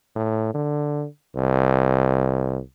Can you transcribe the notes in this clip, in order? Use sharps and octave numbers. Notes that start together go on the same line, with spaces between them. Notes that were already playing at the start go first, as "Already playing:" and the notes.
A2
D3
C2